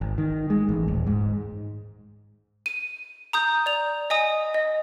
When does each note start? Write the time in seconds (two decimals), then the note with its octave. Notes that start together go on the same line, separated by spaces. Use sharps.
0.01 G#1
0.18 D#3
0.50 G#3
0.69 A1
0.88 D#1
1.07 G#2
2.66 D#7
3.33 A#5 D#6 G6
3.66 D5 F7
4.10 D#5 G#5 D#6
4.54 D#5